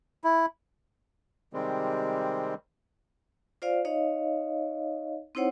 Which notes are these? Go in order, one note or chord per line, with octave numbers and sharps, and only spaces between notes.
E4
C3 D#3 G3 G#3 C4
F4 C5 D5 F5
D#4 C#5 D#5 F5
C4 D#4 E4 C5 C#5 F#5